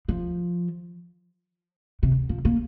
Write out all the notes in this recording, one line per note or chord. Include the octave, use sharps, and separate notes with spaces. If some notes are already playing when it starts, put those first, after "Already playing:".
F3
C3
F3
A#3